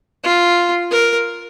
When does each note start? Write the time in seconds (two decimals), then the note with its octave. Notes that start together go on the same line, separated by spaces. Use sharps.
0.24 F4
0.91 A#4